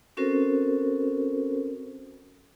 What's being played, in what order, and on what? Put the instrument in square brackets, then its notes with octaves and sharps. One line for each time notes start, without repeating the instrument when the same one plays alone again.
[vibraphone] C4 C#4 F#4 A4 A#4 C5